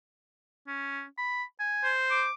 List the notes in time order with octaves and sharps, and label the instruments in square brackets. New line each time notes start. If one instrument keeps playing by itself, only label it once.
[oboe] C#4
B5
G#5
[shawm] C5
[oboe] D6